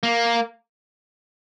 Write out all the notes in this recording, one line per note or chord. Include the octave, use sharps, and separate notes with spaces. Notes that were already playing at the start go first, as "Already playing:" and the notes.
A#3